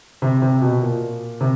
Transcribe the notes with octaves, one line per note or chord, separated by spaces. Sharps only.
C3
C3
B2
A#2
C3